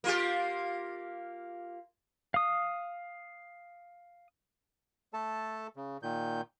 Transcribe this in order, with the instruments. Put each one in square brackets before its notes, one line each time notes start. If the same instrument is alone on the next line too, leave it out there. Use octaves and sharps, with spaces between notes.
[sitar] A#3 F4 G4
[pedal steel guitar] F5 D#6
[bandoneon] A3 A4 A5
C#3
A#2 D#3 G6